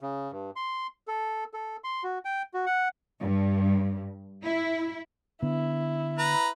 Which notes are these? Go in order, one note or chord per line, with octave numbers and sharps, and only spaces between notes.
C#3
G2
C6
A4
A4
C6
F#4
G5
F#4
F#5
G2
E4
D3 B3 E4
B4 A#5